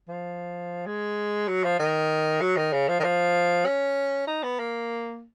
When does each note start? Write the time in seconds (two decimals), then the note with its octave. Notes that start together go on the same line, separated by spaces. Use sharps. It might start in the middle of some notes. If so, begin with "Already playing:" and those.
0.08 F3
0.86 G#3
1.48 F#3
1.64 F3
1.79 D#3
2.41 F#3
2.56 D#3
2.73 C#3
2.88 F3
3.00 D#3
3.04 F3
3.66 C#4
4.27 D#4
4.43 B3
4.59 A#3